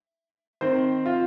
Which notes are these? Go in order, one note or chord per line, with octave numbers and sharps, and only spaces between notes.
D#3 C4 C5
F4